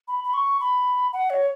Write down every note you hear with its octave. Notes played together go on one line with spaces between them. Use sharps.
B5
B5
C#6
B5
F#5
C#5